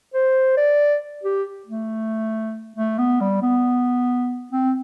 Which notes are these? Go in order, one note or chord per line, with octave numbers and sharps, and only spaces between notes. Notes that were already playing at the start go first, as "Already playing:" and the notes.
C5
D5
G4
A3
A3
B3
G3
B3
C4